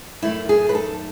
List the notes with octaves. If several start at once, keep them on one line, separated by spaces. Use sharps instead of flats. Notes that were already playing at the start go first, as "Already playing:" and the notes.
F#2 D#3 A3 E4
G#4
B4
A4